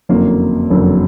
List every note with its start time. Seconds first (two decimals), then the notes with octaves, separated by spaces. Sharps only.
0.09 F#1 F2 D3 F#3 A#3
0.70 F#1 F2 D3 F#3 A#3